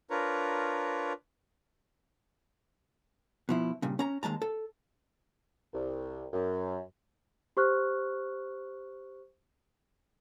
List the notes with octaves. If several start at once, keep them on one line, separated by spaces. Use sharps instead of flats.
D4 F4 A#4 B4 C#5 A#5
B2 F3 E4
G2 A#2 C#3
C#4 A#5
D#2 G#3 A5 A#5
A4
C2
F#2
G4 C5 C#6 F6 F#6